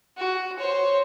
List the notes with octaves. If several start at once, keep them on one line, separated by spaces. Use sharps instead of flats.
F#4
C5 C#5